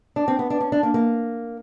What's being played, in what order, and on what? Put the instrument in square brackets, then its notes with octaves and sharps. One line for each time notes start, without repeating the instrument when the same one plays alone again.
[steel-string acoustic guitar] D4
C4
B3
D4
C#4
D4
A#3
A#3